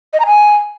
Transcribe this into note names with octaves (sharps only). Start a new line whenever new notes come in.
D#5
A#5
G#5